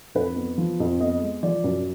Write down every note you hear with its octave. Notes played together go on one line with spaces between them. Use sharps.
F2 B4
B3
F3
F2
B3 D#5
G#3
F3 D5
F#2